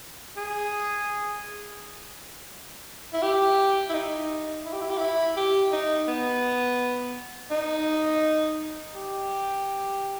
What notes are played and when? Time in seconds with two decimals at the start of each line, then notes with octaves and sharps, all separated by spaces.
0.36 G#4
3.13 E4
3.22 G4
3.89 E4
3.93 D#4
4.65 E4
4.73 G4
4.81 E4
4.90 G4
4.98 E4
5.37 G4
5.72 D#4
6.08 B3
7.51 D#4
8.93 G4